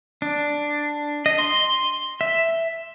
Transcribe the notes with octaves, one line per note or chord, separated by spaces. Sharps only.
D4
D#5
C6
E5